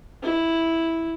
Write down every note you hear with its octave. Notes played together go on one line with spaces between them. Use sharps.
E4